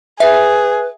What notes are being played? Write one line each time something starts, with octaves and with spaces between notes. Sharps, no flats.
G#4 B4 E5